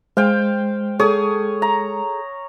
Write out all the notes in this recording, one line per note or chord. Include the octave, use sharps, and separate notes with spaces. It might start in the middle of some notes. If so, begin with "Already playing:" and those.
G#3 C5 F5 G5
G#4 A4 C#5 D#6
A#5